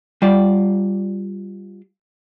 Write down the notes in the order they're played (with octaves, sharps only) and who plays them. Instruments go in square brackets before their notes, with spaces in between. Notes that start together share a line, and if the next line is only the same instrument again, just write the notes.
[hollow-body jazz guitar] G3 F4 D5